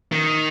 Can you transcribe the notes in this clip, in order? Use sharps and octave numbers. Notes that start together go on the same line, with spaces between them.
D#3